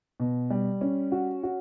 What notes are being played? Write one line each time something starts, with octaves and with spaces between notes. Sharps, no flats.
B2
G3
C#4
F#4
F#4